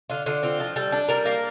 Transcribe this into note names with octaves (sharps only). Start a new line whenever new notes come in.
D3 F4
D3 F4
C4 F4
F3
G3 A4
D4
G3 A#4
A#3